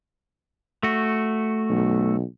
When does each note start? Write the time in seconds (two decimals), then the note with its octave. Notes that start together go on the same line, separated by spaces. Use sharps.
0.83 A3 F#4
1.69 B1